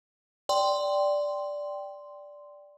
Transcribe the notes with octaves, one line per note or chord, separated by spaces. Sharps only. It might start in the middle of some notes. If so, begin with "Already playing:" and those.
D5 G5 C6